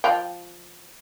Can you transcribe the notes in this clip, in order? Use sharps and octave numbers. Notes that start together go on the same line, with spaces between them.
F3 F5 G5